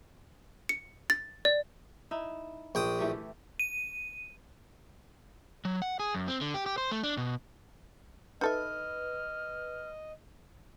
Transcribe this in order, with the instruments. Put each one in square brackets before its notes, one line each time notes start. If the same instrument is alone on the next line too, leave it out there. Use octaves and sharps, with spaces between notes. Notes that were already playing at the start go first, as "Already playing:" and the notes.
[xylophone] C#7
A6
D5
[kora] D#4 E4
[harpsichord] A#1 G5 D#6
[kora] E3 A3 G4
[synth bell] D#7
[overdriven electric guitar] F#3
F#5
G#4
F#2
C4
D3
G4
G4
C5
A3
D4
B2
[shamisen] D#4 A4 E5 [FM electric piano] B4 [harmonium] D#5 [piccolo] F6